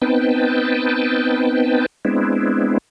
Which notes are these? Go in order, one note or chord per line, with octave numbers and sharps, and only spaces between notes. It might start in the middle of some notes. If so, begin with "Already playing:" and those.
B3 C4 D#4 B4 G5 A5
G#3 B3 C4 D4 E4